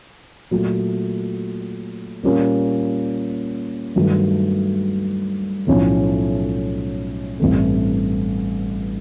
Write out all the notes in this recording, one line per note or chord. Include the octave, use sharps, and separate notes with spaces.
A#2 F#3 A3
A#2 G3 A#3 C#4
G2 D#3 F#3 A3
B1 A2 F3 A3 C#4
A1 G2 E3 A3 C4